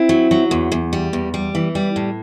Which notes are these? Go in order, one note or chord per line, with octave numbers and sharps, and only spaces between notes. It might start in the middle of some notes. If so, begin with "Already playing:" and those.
Already playing: C4 E4
F#3
F#3
E2
E2
G3
E2
G3
E3
G3
A2